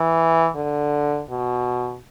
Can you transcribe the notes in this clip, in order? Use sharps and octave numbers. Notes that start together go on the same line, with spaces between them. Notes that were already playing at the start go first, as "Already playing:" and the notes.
Already playing: E3
D3
B2